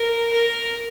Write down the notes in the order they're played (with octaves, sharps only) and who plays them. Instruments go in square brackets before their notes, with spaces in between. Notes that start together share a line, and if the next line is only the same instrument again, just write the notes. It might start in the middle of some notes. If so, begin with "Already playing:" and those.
Already playing: [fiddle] A#4
A#4